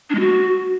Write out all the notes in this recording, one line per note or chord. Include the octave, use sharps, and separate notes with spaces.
D4
G#3
F#4